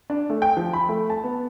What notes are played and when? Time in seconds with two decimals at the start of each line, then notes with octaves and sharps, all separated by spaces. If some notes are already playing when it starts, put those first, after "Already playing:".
0.10 D4
0.30 A3
0.42 G5
0.57 F3
0.73 B5
0.89 A3
1.10 A5
1.24 B3